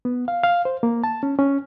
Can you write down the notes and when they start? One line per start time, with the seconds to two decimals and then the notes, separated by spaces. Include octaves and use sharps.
0.05 B3
0.28 F5
0.44 F5
0.65 C5
0.83 A#3
1.04 A5
1.23 C#4
1.39 C#4